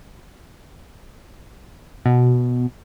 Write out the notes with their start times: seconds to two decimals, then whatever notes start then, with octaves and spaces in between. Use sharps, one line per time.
2.06 B2